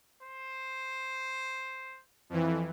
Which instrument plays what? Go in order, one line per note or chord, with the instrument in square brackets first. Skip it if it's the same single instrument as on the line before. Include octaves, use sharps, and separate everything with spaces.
[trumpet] C5
[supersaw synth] F2 E3